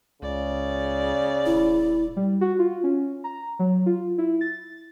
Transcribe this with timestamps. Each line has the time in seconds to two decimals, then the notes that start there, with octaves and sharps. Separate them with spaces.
0.22 C#2 C#3 D5
1.46 D#1 E4
2.16 G3
2.41 F#4
2.59 F4
2.84 C#4
3.24 A#5
3.59 F#3
3.86 F4
4.18 E4
4.41 A6